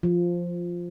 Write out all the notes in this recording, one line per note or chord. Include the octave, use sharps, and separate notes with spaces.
F3